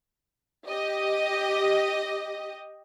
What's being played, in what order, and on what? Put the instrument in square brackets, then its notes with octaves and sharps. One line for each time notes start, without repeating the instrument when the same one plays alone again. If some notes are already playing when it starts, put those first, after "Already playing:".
[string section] G4 D#5